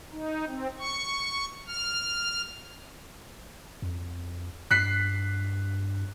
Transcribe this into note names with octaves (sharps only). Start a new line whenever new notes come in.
D#4
C4
C#6
F6
F2
G2 F#6 B6 C7